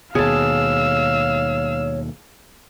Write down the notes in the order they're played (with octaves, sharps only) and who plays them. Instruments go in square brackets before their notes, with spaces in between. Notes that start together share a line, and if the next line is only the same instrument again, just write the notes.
[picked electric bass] D#2 B2 [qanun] G#4 A5 [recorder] C#5 [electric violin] F5 E6